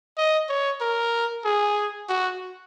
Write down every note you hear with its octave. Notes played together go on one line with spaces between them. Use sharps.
D#5
C#5
A#4
G#4
F#4